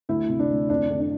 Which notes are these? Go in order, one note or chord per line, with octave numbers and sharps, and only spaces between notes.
D2 E4
C3
D4
D2
F2 D4
D3
D4